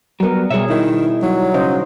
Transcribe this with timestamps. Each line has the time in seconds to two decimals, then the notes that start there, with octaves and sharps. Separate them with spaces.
0.20 F#3 G3 B3 A#4
0.51 B2 G3 G#4 C#5 E5
0.70 D#3 E4
1.23 F#3 G3 D#4
1.54 C#3 C5 D#5